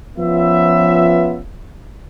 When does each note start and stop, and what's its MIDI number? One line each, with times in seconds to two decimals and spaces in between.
0.18 1.40 53
0.18 1.40 59
0.18 1.40 61
0.18 1.40 65
0.18 1.40 71
0.18 1.40 76